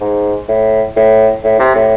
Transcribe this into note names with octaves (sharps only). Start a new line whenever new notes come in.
G#2
A2
A2
A2
C3
A2